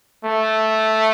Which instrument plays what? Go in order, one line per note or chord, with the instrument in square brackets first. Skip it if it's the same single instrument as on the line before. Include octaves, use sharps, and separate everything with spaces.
[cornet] A3